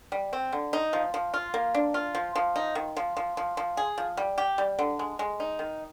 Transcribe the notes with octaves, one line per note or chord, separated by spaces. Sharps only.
G3
C4
D3
D#4
F3
F3
F4
A#3
D4
F4
F3
F3
D#4
D#3
F3
F3
F3
F3
G#4
F3
G3
G4
G3
D3
G#3
G#3
D#4
D#3